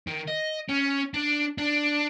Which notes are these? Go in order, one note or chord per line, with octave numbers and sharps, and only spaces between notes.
D#3
D#5
C#4
D4
D4